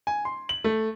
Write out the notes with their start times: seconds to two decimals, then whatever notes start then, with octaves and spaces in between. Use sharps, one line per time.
0.07 G#5
0.25 C6
0.49 F#7
0.64 A3